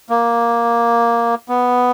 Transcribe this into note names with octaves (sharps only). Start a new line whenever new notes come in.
A#3
B3